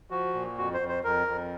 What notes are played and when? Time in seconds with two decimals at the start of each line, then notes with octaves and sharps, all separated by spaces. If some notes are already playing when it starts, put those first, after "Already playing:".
0.10 F3 F#4
0.34 A#2
0.57 F2 F#4
0.74 C5
0.81 F2
0.88 C5
1.04 F2 A#4
1.28 F2